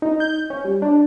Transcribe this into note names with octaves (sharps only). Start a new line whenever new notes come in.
D#4
G6
C#4
G3
D4